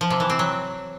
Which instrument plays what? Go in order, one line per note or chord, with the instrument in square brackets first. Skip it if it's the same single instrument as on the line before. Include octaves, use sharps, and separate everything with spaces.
[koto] F3
C3
E3
C4
F#3